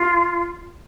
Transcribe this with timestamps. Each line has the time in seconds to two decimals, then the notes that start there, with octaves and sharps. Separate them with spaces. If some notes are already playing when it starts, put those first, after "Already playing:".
Already playing: F4